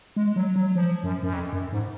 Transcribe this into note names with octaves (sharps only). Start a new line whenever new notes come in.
G#3
F#3
F#3
F3
F#2
F#2
F2
F#2
G#2